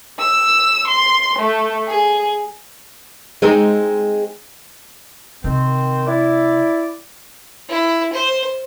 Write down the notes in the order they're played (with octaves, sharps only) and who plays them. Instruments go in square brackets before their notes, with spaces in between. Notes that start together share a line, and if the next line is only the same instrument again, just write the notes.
[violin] E6
C6
A3
G#4
[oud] G#3 C4 D#4
[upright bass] C3 [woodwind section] D#3 C4
[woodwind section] E4 D5
[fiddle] E4
C5